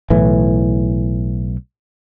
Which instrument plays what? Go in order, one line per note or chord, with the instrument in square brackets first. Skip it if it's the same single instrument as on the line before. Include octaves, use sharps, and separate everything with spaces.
[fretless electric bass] B1 A2 E3